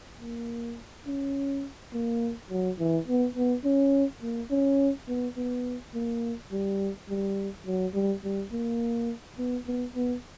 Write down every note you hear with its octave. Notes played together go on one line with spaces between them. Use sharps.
A#3
C#4
A#3
F#3
E3
B3
B3
C#4
A#3
C#4
B3
B3
A#3
G3
G3
F#3
G3
G3
A#3
B3
B3
B3